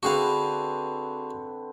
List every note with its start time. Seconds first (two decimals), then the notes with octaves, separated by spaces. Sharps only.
0.03 D3 C4 F#4 G#4 B4 F5